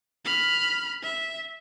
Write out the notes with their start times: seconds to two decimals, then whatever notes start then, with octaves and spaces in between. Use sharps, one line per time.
0.25 B5 F6
1.03 E5